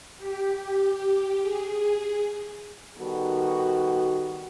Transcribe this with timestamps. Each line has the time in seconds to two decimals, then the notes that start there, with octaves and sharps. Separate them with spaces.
0.19 G4
1.41 G#4
2.99 D#3 G3 B3 F#4 A4